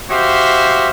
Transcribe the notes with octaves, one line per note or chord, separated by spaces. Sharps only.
F#4 G4 C5 E5 F5